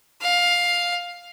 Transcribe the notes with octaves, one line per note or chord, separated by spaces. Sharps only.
F5